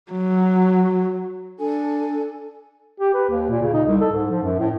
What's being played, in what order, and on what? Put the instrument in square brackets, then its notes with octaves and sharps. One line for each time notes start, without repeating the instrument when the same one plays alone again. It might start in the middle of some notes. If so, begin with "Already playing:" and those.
[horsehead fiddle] F#3
[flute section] D4 A4 G#5
[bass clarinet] G4
B4
D#2
A#2
C#3
D#4
C2
A4
G#2
F3
F#2
A2